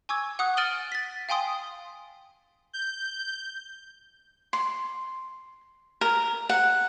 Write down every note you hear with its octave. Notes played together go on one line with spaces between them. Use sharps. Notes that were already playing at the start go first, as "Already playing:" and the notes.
G#5 C#6 D6 E6 G#6
F#5 C#6 D#6 F#6
F6 A6 D7 D#7 F#7 G7
A6 B6
F5 G5 G#5 C6 D#6
G6
C6
A#4
F#5